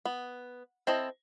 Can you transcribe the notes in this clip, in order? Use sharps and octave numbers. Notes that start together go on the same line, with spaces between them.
B3
C4 E4 A4 D#5